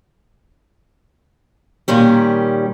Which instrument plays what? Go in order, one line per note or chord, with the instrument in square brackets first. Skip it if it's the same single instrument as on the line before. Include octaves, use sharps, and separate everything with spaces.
[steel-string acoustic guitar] A#2 D#3 G3 C#4